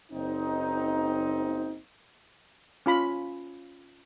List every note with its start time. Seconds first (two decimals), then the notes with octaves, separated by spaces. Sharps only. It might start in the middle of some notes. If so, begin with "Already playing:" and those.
0.12 F#1 C4 D#4
2.86 C#4 F4 B5